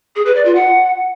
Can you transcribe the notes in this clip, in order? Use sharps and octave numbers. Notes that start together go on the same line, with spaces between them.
G#4
B4
D5
F4
F#5